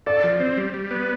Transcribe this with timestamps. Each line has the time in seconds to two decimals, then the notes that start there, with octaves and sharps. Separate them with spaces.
0.07 A4 D5
0.24 F3
0.40 C4
0.57 G3
0.74 G3
0.91 B3